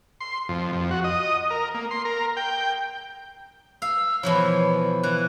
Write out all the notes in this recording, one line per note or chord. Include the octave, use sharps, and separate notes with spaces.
C6
F2
F2
F#4
D#5
A#4
A#3
C6
A#4
G5
F5 E6
B2 E3 F3 C#5
E3 F#6